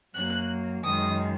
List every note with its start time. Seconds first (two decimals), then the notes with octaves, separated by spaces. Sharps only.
0.14 F#2 F#3 A#3 F#6
0.83 F#2 D#3 G#3 D#6